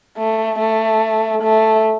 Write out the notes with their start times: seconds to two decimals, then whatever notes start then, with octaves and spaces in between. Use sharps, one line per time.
0.17 A3
0.59 A3
1.43 A3